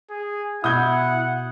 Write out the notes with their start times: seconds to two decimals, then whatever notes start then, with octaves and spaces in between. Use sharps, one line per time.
0.10 G#4
0.64 B2 E4 F#5 D#6 G6 G#6